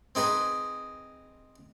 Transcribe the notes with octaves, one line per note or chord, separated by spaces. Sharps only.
C4 D#4 G#4 B4